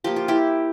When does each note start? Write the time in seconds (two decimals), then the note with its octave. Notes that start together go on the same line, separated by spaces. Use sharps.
0.04 F3 A#3 G4
0.16 F4
0.28 E4 G4